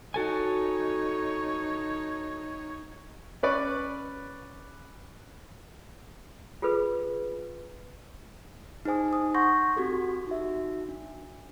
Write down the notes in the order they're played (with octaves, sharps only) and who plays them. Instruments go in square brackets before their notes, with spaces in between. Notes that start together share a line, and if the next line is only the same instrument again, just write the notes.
[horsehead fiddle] D#4 C#5 [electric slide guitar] F#4 A4 G#5
[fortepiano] C#4 B4 D5 C#6
[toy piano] F4 G#4 A4 B4
[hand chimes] D#4 G#4 C5 G#5 D#6
D#4 D#6
F#5 C6 C#6 G6 A#6
C4 F#4 G4 A4
D#4 F#4 E5
D4